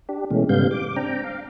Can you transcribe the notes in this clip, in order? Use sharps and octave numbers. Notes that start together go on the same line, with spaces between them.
D4 G4
B2 E3 G#3 A3 C#4
G#2 C#3 G3 B3 F5 G6
D6
C4 D4 G5 A#5
F5